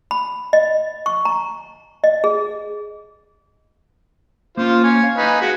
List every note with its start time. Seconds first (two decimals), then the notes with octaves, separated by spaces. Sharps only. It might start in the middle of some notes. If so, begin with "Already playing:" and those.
0.11 B5
0.53 D#5
1.06 C#6
1.25 A#5
2.04 D#5
2.24 G#4
4.57 A#3 C#4 F4 C5
4.84 G#5 C#6
5.03 F5
5.17 D#4 B4 G#5
5.41 G#3 F#4 F#5